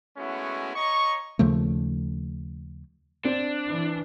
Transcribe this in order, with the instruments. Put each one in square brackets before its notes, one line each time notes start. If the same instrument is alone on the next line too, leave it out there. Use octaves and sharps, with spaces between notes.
[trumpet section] G#3 A3 B3 C#4 E4 F#4
C#5 D#5 A#5 C#6
[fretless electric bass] D#2 C#3 F3 A3
[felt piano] C4 [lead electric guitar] D4
[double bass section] E3